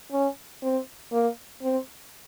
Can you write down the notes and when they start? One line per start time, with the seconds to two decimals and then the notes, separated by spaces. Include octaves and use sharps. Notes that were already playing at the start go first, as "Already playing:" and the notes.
0.12 C#4
0.62 C4
1.12 A#3
1.62 C4